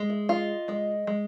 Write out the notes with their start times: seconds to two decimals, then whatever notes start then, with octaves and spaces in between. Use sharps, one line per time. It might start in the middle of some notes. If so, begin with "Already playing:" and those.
Already playing: G#3
0.10 E5
0.29 F4 D#5
0.68 G#3 D#5
1.07 G#3